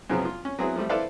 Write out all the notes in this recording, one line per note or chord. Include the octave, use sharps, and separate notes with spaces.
F#2 C#3 F3 F#3 B3
F4
C#4
F#3 B3 C4 E4 G#4
F3 G3 A3
E4 A4 B4 C5 D5 F5